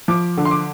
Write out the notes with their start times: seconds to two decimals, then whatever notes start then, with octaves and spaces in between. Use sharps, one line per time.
0.08 F3 D6
0.37 D3
0.45 C6
0.51 D6